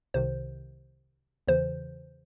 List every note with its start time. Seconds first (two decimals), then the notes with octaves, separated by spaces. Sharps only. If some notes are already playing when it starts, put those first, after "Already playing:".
0.14 C2 C3 D#3 C5
1.47 E2 C#3 E3 C5